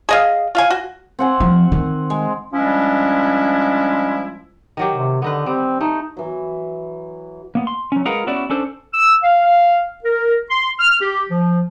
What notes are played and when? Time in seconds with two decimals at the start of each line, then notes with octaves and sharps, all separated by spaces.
0.09 G#4 D#5 F5
0.55 F4 F5 G#5
0.70 F#4
1.19 C4 F#5 G#5
1.40 F3
1.72 D#3
2.10 G#3
2.53 F3 G3 G#3 C#4 D4 E4
4.77 D#3 F#3 G4
4.94 C3
5.22 D3 B3 D#4 B4
5.46 G3 C4
5.81 A3 D#4
6.17 E3 F#3
7.55 A#3 B3
7.67 C6
7.92 F#3 C#4
8.05 G#3 F4 G#4 A#4 B4 F#5
8.27 B3 C#4 E4 F#4 D5
8.50 C#4 D4 A4 C5
8.94 E6
9.23 F5
10.03 A#4
10.50 C6
10.79 F6
11.01 G4
11.29 F3